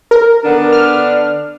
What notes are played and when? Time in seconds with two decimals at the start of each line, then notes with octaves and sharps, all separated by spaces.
0.11 A#4
0.44 D3 B3 D4
0.72 F6